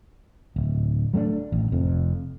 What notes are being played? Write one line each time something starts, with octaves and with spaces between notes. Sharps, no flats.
D1
F#3 A3 C4 D4
A1
F1 F2